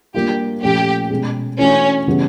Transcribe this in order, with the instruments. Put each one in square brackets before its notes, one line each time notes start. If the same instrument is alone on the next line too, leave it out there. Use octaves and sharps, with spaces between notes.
[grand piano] G3 A#3 D4 F4 [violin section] G4
[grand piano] A#2 F3 A3 C#4 [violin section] G4
[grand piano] B2 G#3 C#4
[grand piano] E3 A3 D4 F#4 [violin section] C#4
[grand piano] C#3 E3 G3 B3 E4